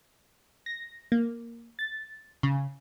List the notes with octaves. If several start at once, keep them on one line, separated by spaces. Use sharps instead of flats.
A#6
A#3
A6
C#3